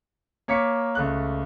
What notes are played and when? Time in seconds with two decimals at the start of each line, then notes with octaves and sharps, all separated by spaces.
0.48 A#3 C#5 D6 B6 C#7
0.95 C#2 A3 F#6